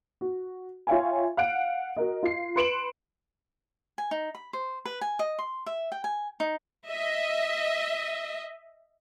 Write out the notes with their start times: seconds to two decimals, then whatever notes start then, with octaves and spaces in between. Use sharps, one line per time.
0.21 F#4
0.87 F4 C#5 E5 F5 G5 G#5
1.37 F5 F#5 F#6 D7
1.97 F#4 A#4 D#5
2.23 F4 C7
2.56 B4 C6 C#7 D7 E7 F#7
3.98 G#5
4.11 D#4
4.35 B5
4.53 C5
4.85 B4
5.01 G#5
5.19 D#5
5.39 C6
5.66 E5
5.92 G5
6.04 G#5
6.40 D#4
6.88 D#5 E5